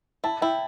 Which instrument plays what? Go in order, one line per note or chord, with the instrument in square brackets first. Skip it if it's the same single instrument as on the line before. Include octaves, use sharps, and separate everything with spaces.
[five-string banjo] E4 [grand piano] A5
[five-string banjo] E4 [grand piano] G5